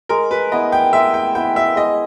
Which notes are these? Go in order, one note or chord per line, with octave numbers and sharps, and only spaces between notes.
G#3 A#4
B4
B3 E4 D#5
G5
G#3 E5
G5
B3 E4 G5
E5
G#3 D#5